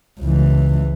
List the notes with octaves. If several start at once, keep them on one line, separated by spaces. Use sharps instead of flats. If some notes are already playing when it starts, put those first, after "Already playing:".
C#2 E3